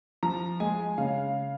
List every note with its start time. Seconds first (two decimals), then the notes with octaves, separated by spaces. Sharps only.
0.23 F3 A#5
0.60 G#3 G#5
0.98 C#3 F5